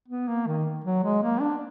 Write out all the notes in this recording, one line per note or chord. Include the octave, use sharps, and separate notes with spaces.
B3
A#3
D#3
F#3
G#3
A#3
D4